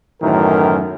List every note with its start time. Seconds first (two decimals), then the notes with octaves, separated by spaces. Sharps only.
0.22 F#2 A2 D#3 E3 A#4